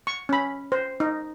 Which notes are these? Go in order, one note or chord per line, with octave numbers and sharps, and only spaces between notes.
C#6
C#4 B5
C5
D#4